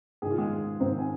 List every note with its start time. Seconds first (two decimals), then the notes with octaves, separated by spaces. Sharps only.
0.22 G#2 D#3 G#4
0.31 F4
0.38 G#3 G#4
0.80 G#2 D#3 C4 C5
0.98 G#5